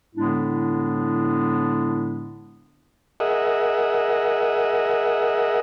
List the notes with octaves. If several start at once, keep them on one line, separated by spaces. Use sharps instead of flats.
A2 D3 G#3 B3 D4 E4
G#4 A#4 D#5 E5 F#5